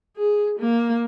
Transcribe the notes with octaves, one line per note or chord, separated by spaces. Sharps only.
G#4
A#3